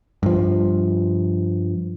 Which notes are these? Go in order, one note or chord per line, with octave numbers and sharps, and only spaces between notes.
G2 F3